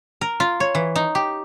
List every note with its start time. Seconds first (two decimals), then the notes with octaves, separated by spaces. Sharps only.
0.21 A#4
0.40 F4
0.60 C#5
0.75 E3
0.96 D#4
1.15 G4